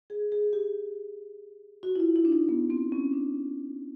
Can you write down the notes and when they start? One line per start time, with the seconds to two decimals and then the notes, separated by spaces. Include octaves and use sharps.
0.10 G#4
0.32 G#4
0.53 G4
1.83 F#4
1.96 E4
2.00 F4
2.16 E4
2.25 D4
2.32 D#4
2.49 B3
2.70 C4
2.92 C#4
3.13 D4